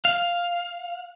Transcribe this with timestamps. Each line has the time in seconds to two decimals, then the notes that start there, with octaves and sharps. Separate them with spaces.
0.05 F5